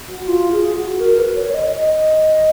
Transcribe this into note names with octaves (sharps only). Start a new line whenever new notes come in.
F#4
F4
G#4
F#4
A#4
B4
C#5
C#5
D#5
D#5